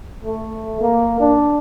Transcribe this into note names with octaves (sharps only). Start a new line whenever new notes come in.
A3
A#3
D4